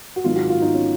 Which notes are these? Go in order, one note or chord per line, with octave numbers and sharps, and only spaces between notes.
F#4
G#1 G#2 D#3 F#3 F4
F#4
F4
D#4
C#4